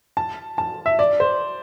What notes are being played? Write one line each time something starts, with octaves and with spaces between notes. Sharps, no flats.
A5
A5
E5
D5
C5